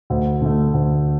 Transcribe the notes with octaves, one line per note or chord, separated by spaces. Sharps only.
D2
D3 A3
D2